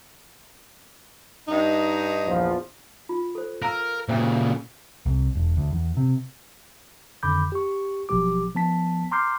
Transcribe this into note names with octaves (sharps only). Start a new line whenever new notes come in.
G2 D#4
A#1 E2 F3
F4
A4 C5
A#4 F5 A#5 E6
A#2 C#3 C5 E5 G5
C2
E1
D2
E2
C3
F2 D3 D#3 B5 D6 G6
G4 C#6
G#1 B2 F3 F#3 G4 D6
F3 B3 A5 B6
A#5 C6 D6 F6 G6 C7